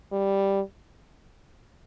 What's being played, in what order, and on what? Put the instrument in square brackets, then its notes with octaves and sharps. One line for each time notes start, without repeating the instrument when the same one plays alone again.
[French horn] G3